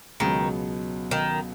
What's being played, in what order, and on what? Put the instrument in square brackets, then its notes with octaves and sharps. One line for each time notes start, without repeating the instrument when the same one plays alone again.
[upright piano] C#2 B2 F#3 B3 [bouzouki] D#3
[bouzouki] D#3